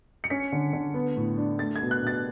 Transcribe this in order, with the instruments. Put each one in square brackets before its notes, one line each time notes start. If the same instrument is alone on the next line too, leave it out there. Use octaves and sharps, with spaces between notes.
[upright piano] C#7
C#4 B6
D3
D3
B3
A2
D4
A3 A6
G#6
B2
F#6
B2 A6